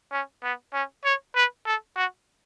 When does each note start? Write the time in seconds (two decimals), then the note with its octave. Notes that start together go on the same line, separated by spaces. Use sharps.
0.12 C#4
0.43 B3
0.73 C#4
1.05 C#5
1.35 B4
1.66 A4
1.96 F#4